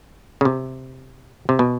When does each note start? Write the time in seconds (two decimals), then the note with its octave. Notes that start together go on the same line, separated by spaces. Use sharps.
0.41 C#3
0.45 C3
1.49 C3
1.59 B2